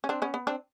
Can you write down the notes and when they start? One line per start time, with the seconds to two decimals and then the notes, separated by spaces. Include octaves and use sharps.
0.04 C#4
0.09 C4 D4
0.22 B3 C#4
0.34 B3
0.47 C4 D4